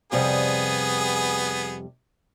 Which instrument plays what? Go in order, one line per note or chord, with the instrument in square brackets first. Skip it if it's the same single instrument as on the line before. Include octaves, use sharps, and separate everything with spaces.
[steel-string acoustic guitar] F2 C3 G3 [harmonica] B3 G#4